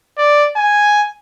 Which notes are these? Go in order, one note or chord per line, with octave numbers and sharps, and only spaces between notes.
D5
G#5